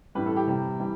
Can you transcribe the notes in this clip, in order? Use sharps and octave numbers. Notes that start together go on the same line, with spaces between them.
A2 E3 G3 B4
A4
G4
C3 G3
E3 G3